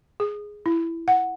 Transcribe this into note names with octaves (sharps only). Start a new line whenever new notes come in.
G#4
E4
F#5